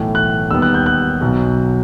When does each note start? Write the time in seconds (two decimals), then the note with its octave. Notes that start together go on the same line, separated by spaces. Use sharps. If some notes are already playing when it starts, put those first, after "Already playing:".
Already playing: B1 A2 E3 A3
0.15 F#6
0.51 D#2 D#3 G3 B3 E6
0.62 F#6
0.74 G6
0.86 F#6
1.21 B1 B2 F#3